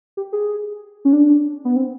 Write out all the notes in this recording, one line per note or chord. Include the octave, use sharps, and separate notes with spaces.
G4
G#4
C#4
D4
B3
C4